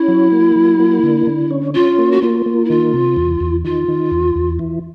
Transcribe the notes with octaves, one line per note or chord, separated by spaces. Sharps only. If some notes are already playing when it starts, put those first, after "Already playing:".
Already playing: C#4 E4
F#3
A#3
F#3
A#3
D3
D3
C#4
C#4 F4
A#3
F#4
A#3 F4
A#3
E4
D#3 F4
C3
E2
E2
D#3 F4
D#3
E2
E2
E3